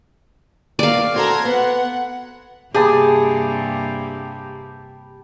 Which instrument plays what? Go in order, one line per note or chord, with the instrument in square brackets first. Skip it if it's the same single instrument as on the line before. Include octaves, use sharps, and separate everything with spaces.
[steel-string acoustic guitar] D#2 A#4 [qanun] D5 F5
[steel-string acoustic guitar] C4 F#4 A4 [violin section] A#5 C6 G#6
[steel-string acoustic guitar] B3 [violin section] F#5
[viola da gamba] G2 C3 A#3 [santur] G4 A5 B5 [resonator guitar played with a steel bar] G#4